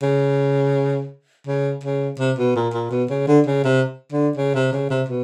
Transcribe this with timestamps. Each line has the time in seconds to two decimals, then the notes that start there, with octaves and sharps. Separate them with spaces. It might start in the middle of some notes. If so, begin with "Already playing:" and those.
0.02 C#3
1.47 C#3
1.84 C#3
2.19 C3
2.38 B2
2.56 A#2
2.74 A#2
2.91 B2
3.10 C#3
3.27 D3
3.46 C#3
3.64 C3
4.12 D3
4.37 C#3
4.55 C3
4.72 C#3
4.90 C3
5.08 B2